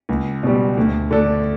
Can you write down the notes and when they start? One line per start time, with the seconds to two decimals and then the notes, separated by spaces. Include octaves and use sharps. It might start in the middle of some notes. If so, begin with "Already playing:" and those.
0.09 C#2
0.43 B2 G3
0.77 D2
1.11 D3 A3 D4 A4